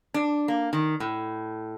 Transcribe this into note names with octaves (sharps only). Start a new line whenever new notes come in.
D4
A#3
D#3
A2